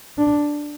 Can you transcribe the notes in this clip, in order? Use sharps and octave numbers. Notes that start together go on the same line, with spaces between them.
D4